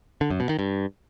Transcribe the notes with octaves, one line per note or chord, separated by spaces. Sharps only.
D3
F#2
B2
D#3
G2